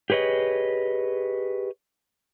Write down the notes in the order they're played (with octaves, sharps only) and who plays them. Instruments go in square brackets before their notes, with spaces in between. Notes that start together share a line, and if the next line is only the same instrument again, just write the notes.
[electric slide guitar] G4 G#4 B4 C#5 D#5